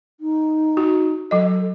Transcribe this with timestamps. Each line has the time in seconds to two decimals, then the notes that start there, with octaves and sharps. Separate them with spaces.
0.20 D#4
0.77 F#4
1.31 F#3 A4 D#5